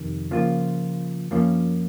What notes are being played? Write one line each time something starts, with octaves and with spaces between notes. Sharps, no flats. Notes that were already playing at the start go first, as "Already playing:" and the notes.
Already playing: F2 C3 D#3
C#3 F3 A#3 F4
F#2 F3 A#3 C#4